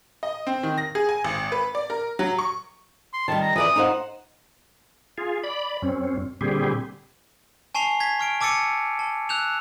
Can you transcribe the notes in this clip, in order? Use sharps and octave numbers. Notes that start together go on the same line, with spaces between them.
D#5
C4
D#3
A#6
G#4
G#5
G#1
B4
D5
A#4
F#3
C#6
C6
D#3 G3 A5
A#5
E3 B4 D5 D#6
D#4 C5 F#5
F4 G#4
D5 B5
F#2 C4 C#4
A#2 D3 G3 C4 G4 G#4
G#5 A5 C#6 C7 F7
G#6 B6
C#6 F6 D7
A5 D6 E6 A6 C#7 D#7
A5
E6 F#6 G6 E7 F7